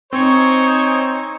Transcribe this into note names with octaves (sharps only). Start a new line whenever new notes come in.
C4 D#4 C5 C#5 G#5 C#6